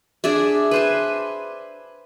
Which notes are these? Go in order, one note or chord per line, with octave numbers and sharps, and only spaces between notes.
D4 G#4 D5 E5
B4 C5 G#5